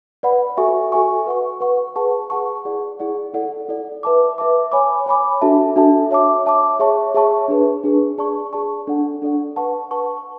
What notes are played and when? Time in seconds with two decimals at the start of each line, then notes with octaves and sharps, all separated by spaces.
0.23 B4 D5 F#5 B5
0.57 F#4 A4 E5 G#5 C#6
0.92 F#4 A4 E5 G#5 C#6
1.26 B4 F#5 C#6
1.60 B4 F#5 C#6
1.96 G#4 B4 F#5 A5 C#6
2.30 G#4 B4 F#5 A5 C#6
2.65 E4 G#4 D5 F#5
2.99 E4 G#4 D5 F#5
3.33 E4 A4 D5 F#5
3.69 E4 A4 D5 F#5
4.03 B4 E5 A5 D6
4.38 B4 E5 A5 D6
4.72 C#5 G#5 B5 D6
5.06 C#5 G#5 B5 D6
5.41 D4 F#4 A4 E5 A5
5.76 D4 F#4 A4 E5 A5
6.11 C#5 E5 A5 D6
6.46 C#5 E5 A5 D6
6.79 G#4 C#5 E5 A5 C#6
7.14 G#4 C#5 E5 A5 C#6
7.48 D4 G#4 B4
7.83 D4 G#4 B4
8.18 G#4 D5 A5 C#6
8.53 G#4 D5 A5 C#6
8.87 D4 A4 D5 F#5
9.22 D4 A4 D5 F#5
9.56 B4 F#5 A5 C#6
9.91 B4 F#5 A5 C#6